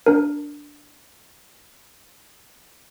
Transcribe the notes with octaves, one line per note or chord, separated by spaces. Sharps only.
D4 A#4